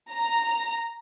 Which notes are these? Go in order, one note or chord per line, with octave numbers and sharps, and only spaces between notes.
A#5